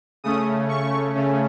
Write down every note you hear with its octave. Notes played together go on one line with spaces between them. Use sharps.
C#3 A3 C#4 D#6
C#6
C#3 A3 C#4